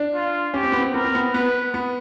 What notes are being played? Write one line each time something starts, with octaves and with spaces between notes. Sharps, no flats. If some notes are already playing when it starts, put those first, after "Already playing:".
Already playing: D4
F4
C#4 G4
C4
B3
C4
B3 A#4
C4
B3
B3 B4
B3